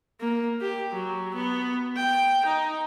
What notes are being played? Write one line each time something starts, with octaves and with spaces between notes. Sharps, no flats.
A#3
G4
F#3
B3
G5
D#4